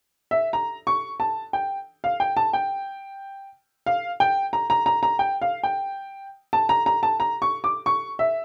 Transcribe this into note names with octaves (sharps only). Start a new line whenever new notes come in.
E5
A#5
C#6
A5
G5
F5
G5
A5
G5
F5
G5
A#5
A#5
A#5
A#5
G5
F5
G5
A5
A#5
A#5
A5
A#5
C#6
D6
C#6
E5